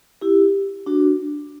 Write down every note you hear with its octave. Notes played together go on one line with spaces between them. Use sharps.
E4 G4
D4 F#4